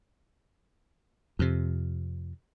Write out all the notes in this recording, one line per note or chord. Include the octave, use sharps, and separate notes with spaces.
F2 C3